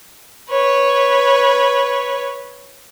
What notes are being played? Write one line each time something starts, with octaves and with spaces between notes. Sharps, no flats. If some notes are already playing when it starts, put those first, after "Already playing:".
B4 C#5